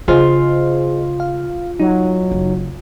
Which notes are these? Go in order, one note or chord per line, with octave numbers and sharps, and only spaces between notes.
C#3 F4 G#4 C5 D#5
F5
F#3 D#4
F#1